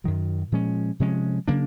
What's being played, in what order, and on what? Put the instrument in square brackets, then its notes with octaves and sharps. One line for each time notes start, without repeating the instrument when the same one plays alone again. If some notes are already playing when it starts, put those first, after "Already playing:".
[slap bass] F#2 D#3 F#3
A#2 F3 G#3 C#4
C3 F3 G#3 C#4
C#3 F#3 A#3 D4